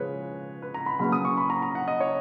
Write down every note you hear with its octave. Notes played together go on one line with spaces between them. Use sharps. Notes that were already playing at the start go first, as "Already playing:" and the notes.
Already playing: C#3 F3 G#3 B4 C#5
B4
A#5
B5
C#3 F#3 A#3 C#4 B5
D#6
C#6
B5
A#5
A#5
F#5
D#5
C#5